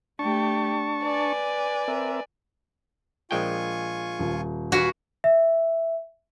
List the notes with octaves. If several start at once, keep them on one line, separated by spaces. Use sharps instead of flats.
A3 D4 G4 A5 C#6
B4 D5 G#5
C4 A#4 E5
A#1 G#3 F4 G5 G#5 C#6
D#1
F#4 B4 F5 G#5
E5